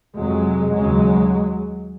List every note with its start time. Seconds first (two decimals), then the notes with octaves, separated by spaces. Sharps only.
0.16 F2 C3 F#3 G#3
0.73 D#2 C#3 F#3 G#3